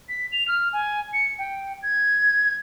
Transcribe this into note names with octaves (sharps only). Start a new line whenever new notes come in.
B6
F7
F6
G#5
C#7
G5
G#6